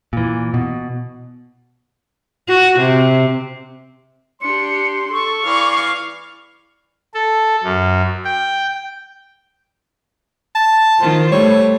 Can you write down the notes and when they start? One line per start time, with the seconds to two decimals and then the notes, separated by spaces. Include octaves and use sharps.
0.13 A#2 E3
0.54 B2
2.48 F#4
2.79 C3
4.42 D4 G4 C6 C#7
5.13 A4 C#6
5.46 E3 D5 F5
7.14 A4
7.63 F#2
8.24 G5
10.55 A5
11.00 D#3 F4 C5
11.32 G3 A3 C#5